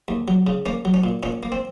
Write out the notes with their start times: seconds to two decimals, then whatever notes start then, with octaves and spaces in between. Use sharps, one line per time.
0.08 D#2
0.28 F#3
0.47 C#3
0.66 A#3 C#4
0.85 F#3
0.94 C#4
1.04 A#2
1.23 A#2 C#4
1.43 A#3
1.52 C4